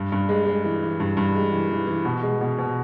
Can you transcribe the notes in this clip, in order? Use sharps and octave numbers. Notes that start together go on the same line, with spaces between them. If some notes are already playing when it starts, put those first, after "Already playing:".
Already playing: G2
G2
G#3
G#3
E3
E3
G2
G2
G#3
E3
E3
E3
B2
G#3
B2
B2